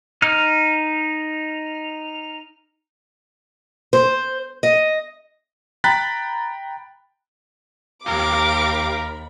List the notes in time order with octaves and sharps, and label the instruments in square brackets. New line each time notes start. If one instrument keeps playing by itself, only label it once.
[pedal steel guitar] D#4 F6
[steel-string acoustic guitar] C5
D#5
[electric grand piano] G5 A#5 B5 F#6 A6 B6
[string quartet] D#2 B5 [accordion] G4 F5 [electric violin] A#4 [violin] D6